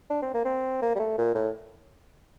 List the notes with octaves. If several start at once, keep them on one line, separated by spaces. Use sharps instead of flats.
D4
C4
A#3
C4
A#3
G3
A3
A#2
A2